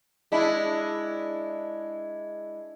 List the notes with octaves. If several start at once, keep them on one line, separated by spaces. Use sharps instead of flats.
G#3 D4 E4